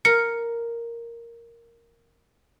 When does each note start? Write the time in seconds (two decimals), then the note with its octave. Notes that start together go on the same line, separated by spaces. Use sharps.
0.05 A#4 C#7